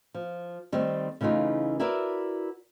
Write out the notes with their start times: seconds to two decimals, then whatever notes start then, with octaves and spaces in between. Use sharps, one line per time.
0.14 F3
0.72 D#3 G3 A3 C4 C5
1.21 C#3 E3 A3 D#4 F4
1.80 E4 F#4 A#4 B4 D5 E5